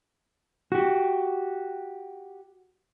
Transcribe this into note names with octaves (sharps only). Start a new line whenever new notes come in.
F#4 G4